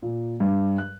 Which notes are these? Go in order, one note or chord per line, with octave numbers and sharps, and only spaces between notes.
A#2
G2
F#6